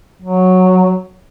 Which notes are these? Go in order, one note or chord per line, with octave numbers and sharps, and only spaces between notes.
F#3